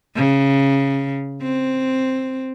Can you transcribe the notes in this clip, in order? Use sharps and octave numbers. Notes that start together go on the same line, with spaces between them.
C#3
C4